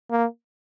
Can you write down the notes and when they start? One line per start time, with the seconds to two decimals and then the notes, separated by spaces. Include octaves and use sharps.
0.11 A#3